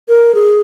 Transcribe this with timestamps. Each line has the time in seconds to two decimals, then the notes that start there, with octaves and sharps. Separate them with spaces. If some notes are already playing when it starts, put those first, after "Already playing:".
0.09 A#4
0.35 G#4